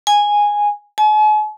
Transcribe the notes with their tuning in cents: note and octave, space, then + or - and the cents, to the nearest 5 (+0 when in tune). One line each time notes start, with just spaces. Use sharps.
G#5 -5
G#5 +45